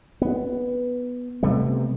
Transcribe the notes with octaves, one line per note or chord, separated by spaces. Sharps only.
B3
C3 G3 A3 B3